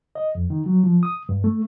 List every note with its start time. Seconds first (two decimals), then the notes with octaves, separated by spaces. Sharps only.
0.15 D#5
0.35 F2
0.50 D#3
0.66 F#3
0.84 F3
1.03 D#6
1.29 G2
1.44 A3